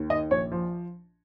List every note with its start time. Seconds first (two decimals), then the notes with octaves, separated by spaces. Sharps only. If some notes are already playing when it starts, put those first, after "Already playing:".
Already playing: D#2
0.10 D#3 D#5
0.31 A#1 C#5
0.52 F3